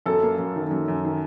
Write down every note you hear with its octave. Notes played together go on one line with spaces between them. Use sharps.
F#2 A4
A#3
F#2
D#3
F#2
F#2
D#3